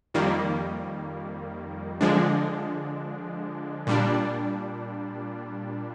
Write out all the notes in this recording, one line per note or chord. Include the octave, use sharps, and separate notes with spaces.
F2 D#3 G3 A#3
D3 F3 G#3 D4
A#2 G3 D4